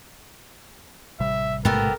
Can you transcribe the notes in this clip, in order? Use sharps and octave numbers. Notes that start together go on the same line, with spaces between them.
A1 C3 G3 E5
G#2 B2 A3 B3 G4 A4 A#4